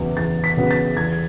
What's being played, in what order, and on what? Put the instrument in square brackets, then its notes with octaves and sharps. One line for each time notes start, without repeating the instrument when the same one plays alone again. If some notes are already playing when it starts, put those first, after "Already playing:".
Already playing: [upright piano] E2 C#3 F#3 B3
E2 A6
B6
C#3 F#3 B3
A6
E2 G#6